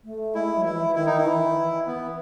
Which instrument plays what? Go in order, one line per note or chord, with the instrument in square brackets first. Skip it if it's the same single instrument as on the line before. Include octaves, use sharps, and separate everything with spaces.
[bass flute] A3
[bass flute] G#3 [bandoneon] E4
[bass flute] F#3
[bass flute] E3 [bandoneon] E4
[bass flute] E3
[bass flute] D#3 [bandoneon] E4
[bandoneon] D#4
E4
[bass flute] E3
E3
[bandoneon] B3